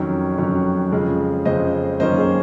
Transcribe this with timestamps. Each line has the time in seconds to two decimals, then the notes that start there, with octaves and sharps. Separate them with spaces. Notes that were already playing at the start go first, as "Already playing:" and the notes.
Already playing: F2 D#3 F#3 C#4 C#5
0.38 F2 D#3 F#3 C#4
0.92 F2 C#3 F3 G#3
1.45 F2 C#3 F3 G#3 C5 D#5
2.00 F#2 D#3 A#3 C#4 C5 D#5
2.18 G#4